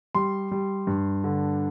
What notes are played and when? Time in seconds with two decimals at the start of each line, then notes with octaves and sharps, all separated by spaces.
0.15 G3 C6
0.51 G3
0.87 G2
1.24 D3